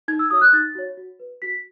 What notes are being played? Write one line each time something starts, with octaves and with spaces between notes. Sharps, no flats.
D#4 G#6
E6
F#4 C#5 D#6
F#6
D#4 A6
F#4 C#5
F#4
B4
F#4 B6